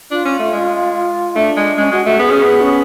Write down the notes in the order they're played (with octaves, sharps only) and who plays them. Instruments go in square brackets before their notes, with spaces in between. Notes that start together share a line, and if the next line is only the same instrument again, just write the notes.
[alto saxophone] D4 [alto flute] F4
[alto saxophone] C#4
A3
G#3
[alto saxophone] A3 [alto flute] D4
[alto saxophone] G#3
[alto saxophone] G#3 [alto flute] C#4
[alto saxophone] G#3 [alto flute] F#4
[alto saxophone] A3 [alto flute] F#4
[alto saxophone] B3 [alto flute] G#4
[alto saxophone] C#4
B3
[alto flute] C#4